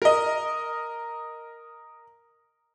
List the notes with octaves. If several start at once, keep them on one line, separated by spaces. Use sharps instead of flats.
A#4 D#5